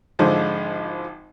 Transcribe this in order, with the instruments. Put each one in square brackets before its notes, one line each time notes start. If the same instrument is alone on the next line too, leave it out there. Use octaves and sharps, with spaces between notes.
[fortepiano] G#1 D3 F3 G#3 C5